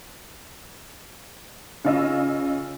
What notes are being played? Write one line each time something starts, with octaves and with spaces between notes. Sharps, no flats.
C#3 C#4 F4 D#5 E6